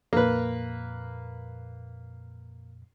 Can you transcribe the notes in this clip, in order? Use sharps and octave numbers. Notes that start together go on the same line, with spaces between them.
F2 A#2 A#3 B4